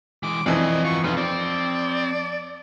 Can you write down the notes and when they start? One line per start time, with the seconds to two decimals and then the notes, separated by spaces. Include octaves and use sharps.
0.23 E3 G#3 D6
0.46 F2 E3 C5 D5 D#5
0.85 B3 F4 C#6
1.04 F2 D#4 F4 B4
1.17 C4 D5